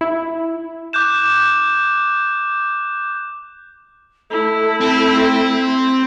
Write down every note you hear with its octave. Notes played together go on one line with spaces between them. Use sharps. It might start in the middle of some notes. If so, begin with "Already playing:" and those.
E4
D6 F#6 G6 E7
A3 E4 A4
C4